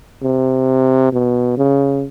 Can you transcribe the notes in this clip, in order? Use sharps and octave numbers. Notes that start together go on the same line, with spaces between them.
C3
B2
C#3